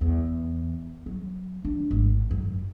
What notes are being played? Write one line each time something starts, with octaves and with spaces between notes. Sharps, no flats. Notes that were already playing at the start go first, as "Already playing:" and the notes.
E2
F#3
D4
G#1
F#2